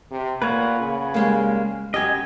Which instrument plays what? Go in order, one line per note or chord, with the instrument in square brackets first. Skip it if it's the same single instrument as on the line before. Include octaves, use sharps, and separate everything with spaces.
[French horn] C3
[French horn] A#2 [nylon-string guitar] A#3 [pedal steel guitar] B4 C#5 F#5
[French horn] C#3
[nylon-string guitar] G3 G#3 A#3
[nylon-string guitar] F#2 G4 [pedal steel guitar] D#5 G#5